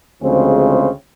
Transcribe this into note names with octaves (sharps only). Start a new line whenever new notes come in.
D2 C#3 F3 G#3 C4